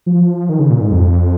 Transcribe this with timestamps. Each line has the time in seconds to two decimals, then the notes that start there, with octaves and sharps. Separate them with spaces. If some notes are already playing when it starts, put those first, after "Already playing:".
0.06 F3
0.49 D#3
0.59 C#3
0.70 A#2
0.81 G#2
0.92 F2